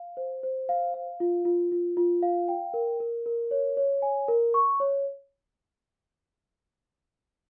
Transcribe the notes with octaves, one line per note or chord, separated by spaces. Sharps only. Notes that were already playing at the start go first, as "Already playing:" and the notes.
Already playing: F5
C5
C5
F5
F5
F4
F4
F4
F4
F5
G5
A#4
A#4
A#4
C#5
C#5
G#5
A#4
C#6
C#5